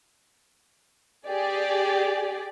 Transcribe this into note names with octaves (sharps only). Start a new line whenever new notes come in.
G4 G#4 D5